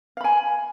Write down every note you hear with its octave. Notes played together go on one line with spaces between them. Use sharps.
F5 G#5 B5